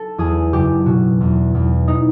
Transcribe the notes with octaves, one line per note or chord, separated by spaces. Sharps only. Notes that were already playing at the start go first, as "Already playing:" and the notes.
Already playing: A4
E2 G#4
F#1 G4
B2 F#4
E2
E2
D#4